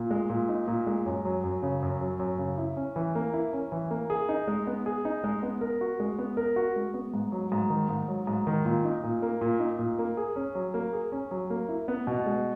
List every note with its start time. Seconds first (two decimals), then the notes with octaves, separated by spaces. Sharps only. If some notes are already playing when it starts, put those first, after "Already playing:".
Already playing: A#2
0.11 G#3
0.30 A#2
0.49 D#4
0.67 A#2
0.87 G#3
1.06 F#2
1.25 F#3
1.44 F#2
1.63 C#3
1.82 F#2
2.01 F#3
2.19 F#2
2.38 C#3
2.58 E4
2.77 C#4
2.96 E3
3.15 A#3
3.34 E4
3.53 C#4
3.72 E3
3.91 A#3
4.10 G#4
4.29 D#4
4.47 G#3
4.67 B3
4.86 G#4
5.05 D#4
5.24 G#3
5.43 B3
5.61 A#4
5.81 F#4
6.00 G#3
6.18 B3
6.37 A#4
6.56 F#4
6.76 G#3
6.94 B3
7.14 G#2
7.32 F#3
7.52 G#2
7.70 D#3
7.89 G#2
8.08 F#3
8.27 G#2
8.47 D#3
8.65 A#2
8.84 D#4
9.03 A#2
9.22 A#3
9.41 A#2
9.60 D#4
9.79 A#2
9.99 A#3
10.17 G#4
10.36 C#4
10.55 F#3
10.74 A#3
10.93 G#4
11.12 C#4
11.31 F#3
11.50 A#3
11.69 E4
11.88 B3
12.07 B2
12.26 G#3